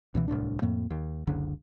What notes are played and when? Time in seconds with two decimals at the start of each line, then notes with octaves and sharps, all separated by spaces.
0.15 C#2 B2 E3
0.28 D1 C2 A2 D4
0.62 F2 A2 A#3
0.90 D#2
1.27 F#1 C#2 D3